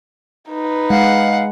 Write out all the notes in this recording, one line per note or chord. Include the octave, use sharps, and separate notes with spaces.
D#4 B4
G#3 F5 F#5